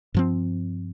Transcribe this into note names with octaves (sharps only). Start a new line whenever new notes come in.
G2 F3 C4